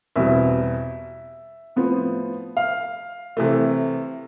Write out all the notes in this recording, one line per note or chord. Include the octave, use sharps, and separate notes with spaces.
E2 B2 G3 C4 E5
A2 F3 B3
F5
C3 E3 A3